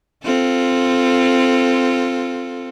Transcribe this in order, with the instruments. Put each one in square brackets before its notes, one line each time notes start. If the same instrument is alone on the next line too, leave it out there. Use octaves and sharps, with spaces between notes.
[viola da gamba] C4 F4 A4